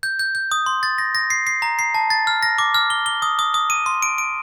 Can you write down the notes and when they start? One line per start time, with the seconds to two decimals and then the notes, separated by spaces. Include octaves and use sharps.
0.03 G6
0.19 G6
0.35 G6
0.52 D#6
0.66 C6
0.83 A6
0.98 A#6
1.15 A#6
1.30 C7
1.47 C7
1.62 A#5
1.79 C7
1.95 A5
2.10 A6
2.27 F6
2.43 A#6
2.58 D6
2.74 F6
2.90 G7
3.06 G7
3.22 D#6
3.39 D#6
3.54 D#6
3.70 D#7
3.86 C6
4.02 D7
4.18 D7